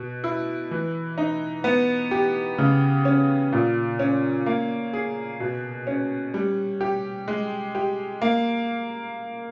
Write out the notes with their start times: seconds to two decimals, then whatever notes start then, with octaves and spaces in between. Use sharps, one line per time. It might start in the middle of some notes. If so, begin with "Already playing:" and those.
Already playing: B2
0.24 E4
0.71 E3
1.18 D#4
1.64 B3
2.11 G4
2.58 C#3
3.05 C#4
3.52 A#2
3.99 C#4
4.46 A#3
4.93 G#4
5.40 B2
5.87 C#4
6.34 G3
6.81 G4
7.28 G#3
7.75 G4
8.22 A#3